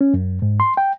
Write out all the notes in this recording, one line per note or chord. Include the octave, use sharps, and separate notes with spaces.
C#4
F#2
G#2
C6
G5